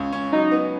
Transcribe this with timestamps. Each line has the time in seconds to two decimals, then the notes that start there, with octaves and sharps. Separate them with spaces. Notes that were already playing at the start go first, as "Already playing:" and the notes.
Already playing: C#2 C#4
0.12 C#4
0.32 F#3 D#4
0.51 B3